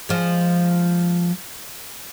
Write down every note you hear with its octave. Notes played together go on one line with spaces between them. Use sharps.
F3 G#3